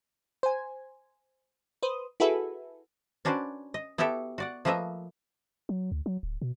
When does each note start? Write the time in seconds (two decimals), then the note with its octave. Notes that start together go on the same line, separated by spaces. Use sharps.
0.43 C5 G#5
1.83 B4 C5 D#6
2.20 E4 F#4 G#4 A4 B4 E5
3.25 C#4 D4 F#4 B4 C5 D5
3.74 D#5
3.98 B3 E4 F#4 G4 A4 E5
4.38 F#4 D5 F#5
4.65 F3 A3 A#3 B4 D#5 E5
5.69 F#3
5.92 D2
6.06 F#3
6.23 D1
6.42 B2